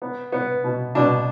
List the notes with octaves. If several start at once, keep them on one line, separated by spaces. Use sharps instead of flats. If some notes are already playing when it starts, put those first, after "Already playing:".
B3
B3
B2
B2 D4